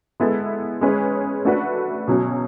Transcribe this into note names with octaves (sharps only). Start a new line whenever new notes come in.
G#3 B3 E4 A4
G#3 C#4 G#4 B4
A3 D4 F#4 B4
B2 F#3 C#4